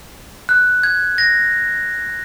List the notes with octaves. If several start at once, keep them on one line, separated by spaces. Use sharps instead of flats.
F#6
G#6
A#6